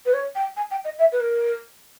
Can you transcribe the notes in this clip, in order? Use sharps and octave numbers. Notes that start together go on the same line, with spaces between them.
B4
C#5
G5
G#5
G5
D#5
E5
B4
A#4